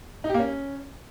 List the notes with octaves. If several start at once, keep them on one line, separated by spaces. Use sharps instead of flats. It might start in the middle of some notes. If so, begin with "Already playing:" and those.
D#4
G4
A#3
C#4